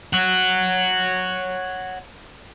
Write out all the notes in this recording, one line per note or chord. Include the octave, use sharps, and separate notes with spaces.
C#5 F#5